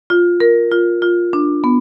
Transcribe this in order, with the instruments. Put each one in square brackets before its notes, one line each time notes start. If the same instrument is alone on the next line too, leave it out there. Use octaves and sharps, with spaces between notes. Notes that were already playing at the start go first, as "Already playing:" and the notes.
[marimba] F4
A#4
F4
F4
D4
B3